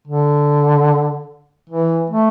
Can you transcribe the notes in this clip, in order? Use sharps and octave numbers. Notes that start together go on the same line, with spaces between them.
D3
E3
A3